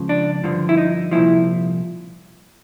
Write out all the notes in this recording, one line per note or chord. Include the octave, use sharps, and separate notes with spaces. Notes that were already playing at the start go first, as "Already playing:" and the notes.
Already playing: C#2 C#3 F3
D4
G2 D3 F3
E4
D#4
C2 A#2 F3 E4